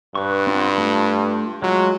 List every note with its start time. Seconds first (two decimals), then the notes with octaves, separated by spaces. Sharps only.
0.15 G2 B4 C#6
0.47 C4 F4 F#5
0.78 A3 F4
1.62 F#3 G#3 F4